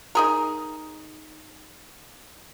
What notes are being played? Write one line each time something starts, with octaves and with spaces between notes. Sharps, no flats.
D#4 G#4 A#4